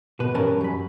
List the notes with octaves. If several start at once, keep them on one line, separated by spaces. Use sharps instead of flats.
B2 B4
G2 E3 C#4 A#4 A5
F#2 B5